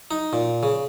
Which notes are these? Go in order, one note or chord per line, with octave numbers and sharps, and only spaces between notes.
D#4
A#2
C#3